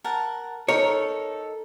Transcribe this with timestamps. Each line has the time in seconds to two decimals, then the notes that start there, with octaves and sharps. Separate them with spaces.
0.04 A#4 F#5 A5
0.68 D#4 A4 A#4 C#5